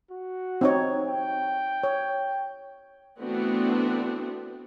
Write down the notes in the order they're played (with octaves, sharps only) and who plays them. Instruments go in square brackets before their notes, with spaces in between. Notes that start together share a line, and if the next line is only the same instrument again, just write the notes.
[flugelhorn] F#4
[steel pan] C4 D#4 C#5
[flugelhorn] G5
[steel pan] C#5
[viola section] E3 A3 B3 C4 D4 F#4